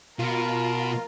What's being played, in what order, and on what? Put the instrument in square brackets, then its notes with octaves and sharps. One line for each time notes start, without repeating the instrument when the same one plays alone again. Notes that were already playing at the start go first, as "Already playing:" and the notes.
[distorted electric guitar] B2 [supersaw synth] F4 [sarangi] A#4